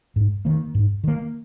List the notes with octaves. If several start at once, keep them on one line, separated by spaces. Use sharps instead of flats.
G#2
D#3 A#3
G#2
D#3 A#3